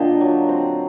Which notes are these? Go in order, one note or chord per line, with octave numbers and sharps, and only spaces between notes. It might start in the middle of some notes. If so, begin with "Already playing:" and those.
Already playing: A#2 D3 D#5 G5
F#3
C4